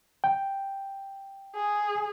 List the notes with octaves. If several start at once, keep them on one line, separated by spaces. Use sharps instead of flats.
G5
G#4